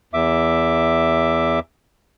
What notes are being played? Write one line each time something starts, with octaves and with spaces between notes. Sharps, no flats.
E2 E5 D6